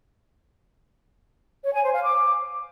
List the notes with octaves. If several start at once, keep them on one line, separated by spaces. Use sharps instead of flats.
C#5
G#5
C5
F5
D6